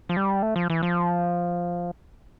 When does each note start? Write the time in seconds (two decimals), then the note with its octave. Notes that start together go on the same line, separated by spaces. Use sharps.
0.09 F3
0.17 G3
0.42 A3
0.56 F3
0.70 E3
0.83 F3